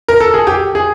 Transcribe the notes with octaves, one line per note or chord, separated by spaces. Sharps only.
A#4
A4
G#4
G4
G#4